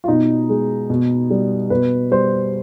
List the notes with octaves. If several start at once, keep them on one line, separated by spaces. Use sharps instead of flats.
F4
B2 D#4
G#3
B2
G3
B2 B4
G3 C5